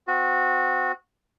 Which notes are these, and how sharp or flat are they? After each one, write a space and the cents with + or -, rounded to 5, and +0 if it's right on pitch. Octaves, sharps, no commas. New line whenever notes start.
C4 -25 F#4 -20